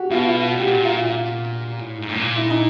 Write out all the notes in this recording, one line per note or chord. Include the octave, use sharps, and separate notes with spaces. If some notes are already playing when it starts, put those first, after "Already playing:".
Already playing: F#4 G4
B2 F4
F4
F#4
A2 G4
A#2 F#4
F4
F4
A2
G#2
A2
A#2
E4
D#4